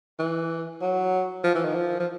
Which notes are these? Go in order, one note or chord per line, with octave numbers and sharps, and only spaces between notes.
E3
F#3
F3
E3
D#3
F3
F3